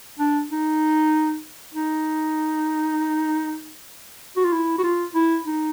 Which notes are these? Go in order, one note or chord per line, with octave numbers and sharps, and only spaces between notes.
D4
D#4
D#4
F#4
F4
E4
F#4
F4
E4
D#4